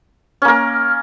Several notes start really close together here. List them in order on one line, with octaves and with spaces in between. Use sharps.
C#4 A#3 A#4